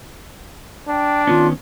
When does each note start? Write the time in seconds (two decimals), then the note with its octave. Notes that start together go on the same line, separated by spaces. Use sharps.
0.88 D4 G5
1.27 D#3 B3 C#4 F4